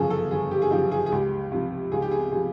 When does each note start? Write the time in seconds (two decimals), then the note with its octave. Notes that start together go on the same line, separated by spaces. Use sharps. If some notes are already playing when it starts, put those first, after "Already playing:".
Already playing: G1 F#2 C#3 F3 G#4 A4
0.10 A4
0.31 G1 G#4
0.51 G4
0.62 G#4
0.71 F#2 C#3 F3 G4
0.91 G#4
1.06 G#4
1.12 C#2 G4
1.52 C3 F3
1.92 C#2 G#4
2.02 G4
2.11 G#4
2.32 C3 F3 G#4